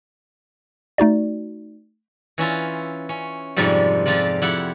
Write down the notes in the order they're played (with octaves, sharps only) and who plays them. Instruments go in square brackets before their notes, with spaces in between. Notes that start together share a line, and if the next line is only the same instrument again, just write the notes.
[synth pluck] A3 D#4 F#4 D5
[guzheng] E3 C#4 E4 F4
C#4
F2 G#2 C3 F3 G3
F2 F3 F4 D5
F2 E4 G4 F#5